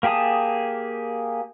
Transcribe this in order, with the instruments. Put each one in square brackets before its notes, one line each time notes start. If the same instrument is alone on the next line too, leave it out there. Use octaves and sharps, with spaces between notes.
[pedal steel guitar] A#3 G4 G#4 A5 D#6